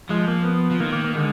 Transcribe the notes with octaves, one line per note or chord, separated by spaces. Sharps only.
F3 G#3
A#3
B3
F3
D#3 A#3
A#3
A#3
D3 G#3